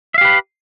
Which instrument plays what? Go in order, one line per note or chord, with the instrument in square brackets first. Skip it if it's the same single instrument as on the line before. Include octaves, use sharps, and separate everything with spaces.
[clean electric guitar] E5
F5
G4
B4